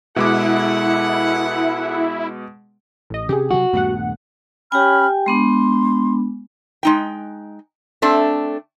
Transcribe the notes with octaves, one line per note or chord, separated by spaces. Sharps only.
B2 G#3 E4 G#4 A4 F#5 D6
A1 D#5
C3 C#4 G4 G#4
C3 F#3 C4 F#4
D#1 G2 A3 B3 F#5
C#4 G4 G5 G#5 B5 F6
G#3 B3 D4 C6
G#3 D#4 G5
A3 C4 D4 A4